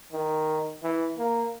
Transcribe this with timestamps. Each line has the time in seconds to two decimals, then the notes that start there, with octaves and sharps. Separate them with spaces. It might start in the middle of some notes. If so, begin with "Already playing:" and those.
0.13 D#3
0.83 E3
1.18 A#3